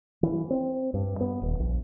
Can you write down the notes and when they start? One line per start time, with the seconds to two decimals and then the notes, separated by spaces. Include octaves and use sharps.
0.23 E3
0.50 C4
0.94 G2
1.21 B3
1.41 D#1
1.60 A#1